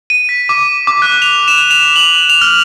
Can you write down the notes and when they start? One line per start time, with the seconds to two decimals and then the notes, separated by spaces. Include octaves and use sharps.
0.10 D#7
0.29 B6
0.49 D6
0.87 D6
1.02 F#6
1.22 F7
1.48 E7
1.71 F7
1.96 F#7
2.30 F7
2.41 F6